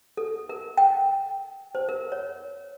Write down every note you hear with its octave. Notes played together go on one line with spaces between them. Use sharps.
A4
A#4
G5
C5
A#4
C#5